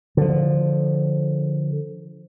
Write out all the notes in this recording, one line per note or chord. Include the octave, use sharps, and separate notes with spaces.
D3 F3